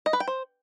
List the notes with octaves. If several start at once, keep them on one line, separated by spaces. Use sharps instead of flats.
D#5
B4
G5
C5